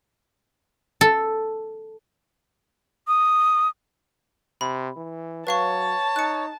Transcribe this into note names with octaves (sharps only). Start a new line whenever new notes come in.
A4
D#6
C3 B5
E3
F#3 B4 C#5 F5 A5 C#6
D#4 F#6 C#7